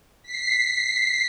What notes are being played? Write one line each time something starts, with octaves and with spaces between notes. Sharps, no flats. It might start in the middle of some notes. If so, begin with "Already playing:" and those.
B6 C7